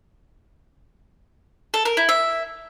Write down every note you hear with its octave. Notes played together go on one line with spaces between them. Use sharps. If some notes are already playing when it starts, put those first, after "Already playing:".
A4
A#4
E4
E5